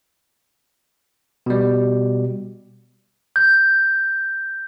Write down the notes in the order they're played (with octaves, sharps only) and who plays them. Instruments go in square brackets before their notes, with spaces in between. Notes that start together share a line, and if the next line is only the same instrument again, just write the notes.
[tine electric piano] B2 G3
[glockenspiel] G6